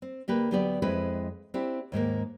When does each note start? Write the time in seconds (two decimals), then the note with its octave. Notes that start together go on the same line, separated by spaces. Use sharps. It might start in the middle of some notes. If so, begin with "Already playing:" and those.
0.02 C4
0.28 D2 A#3 G4 B4
0.51 D2 F#3 B3 G4 D5
0.82 F2 G#3 C4 E4 B4
1.54 C4 D4 E4 G4
1.92 D#2 G#2 G#3 A#3